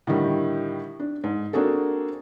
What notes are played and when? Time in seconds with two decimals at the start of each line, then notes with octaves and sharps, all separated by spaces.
0.07 A2 D3 D#3 G3
1.00 D4
1.24 G#2
1.53 A#3 C4 D4 F#4 G#4 A4